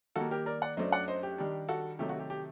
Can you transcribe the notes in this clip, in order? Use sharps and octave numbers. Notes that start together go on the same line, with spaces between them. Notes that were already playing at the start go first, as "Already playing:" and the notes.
D#3 G3 A#3 F#4 A4
G4 A#4
A#4 D5
D5 F#5
F#2 F#3 A3 D4 C5 D#5
D5 F#5
C5 D#5
G4
D#3 G3 D4
F#4 A4
C3 D#3 F#3 A3 G4
F#4
G4
G4